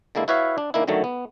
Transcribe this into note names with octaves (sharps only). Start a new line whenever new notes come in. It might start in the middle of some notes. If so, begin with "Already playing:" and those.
D3 G#3 A#3 E4
E4 F#4 B4 C#5 E5 F5
D4
D#3 A#3 D4 E4
F#2 D3 D#3 F#3 A3
B3